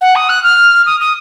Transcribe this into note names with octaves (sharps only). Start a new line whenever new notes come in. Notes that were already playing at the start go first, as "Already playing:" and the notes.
F#5
D#6
F#6
F6
D#6
D#6